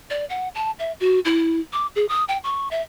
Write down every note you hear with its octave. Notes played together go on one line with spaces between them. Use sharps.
D5
F#5
A5
E5
F#4
E4
D6
G#4
D#6
G5
C#6
E5